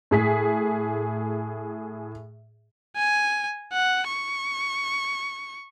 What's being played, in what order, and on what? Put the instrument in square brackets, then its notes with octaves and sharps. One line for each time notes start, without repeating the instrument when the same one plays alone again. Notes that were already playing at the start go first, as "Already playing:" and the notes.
[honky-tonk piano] A2 G#4 B6
[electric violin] G#5
F#5
C#6